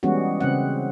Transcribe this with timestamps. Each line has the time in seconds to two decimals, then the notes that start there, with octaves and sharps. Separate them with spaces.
0.03 E3 G3 G#3 B3 C#4 F#4
0.40 C#3 C4 F#5